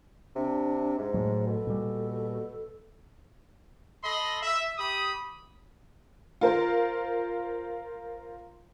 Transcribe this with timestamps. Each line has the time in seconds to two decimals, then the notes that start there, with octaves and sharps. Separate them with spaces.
0.36 C3 D4
0.98 G#2 G#3
1.14 A2 F#3
1.47 B2 A4
1.67 A#2 G3
4.04 A4 D#5 B5 C6
4.43 E5
4.78 G4 B5 D#6
6.41 F4 A#4 C5